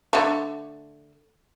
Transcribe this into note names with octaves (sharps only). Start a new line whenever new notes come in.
D3 A3